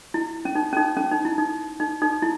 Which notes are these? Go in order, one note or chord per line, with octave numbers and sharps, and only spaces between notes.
E4
C#4
D#4
C#4
D#4
C#4
D#4
E4
D#4
D#4
D#4
E4